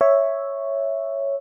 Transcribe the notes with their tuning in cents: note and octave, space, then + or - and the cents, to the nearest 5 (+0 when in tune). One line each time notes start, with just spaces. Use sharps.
C#5 +0 E5 +0